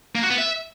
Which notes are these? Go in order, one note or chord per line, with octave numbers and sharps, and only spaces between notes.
A#3
F#4
B3
E5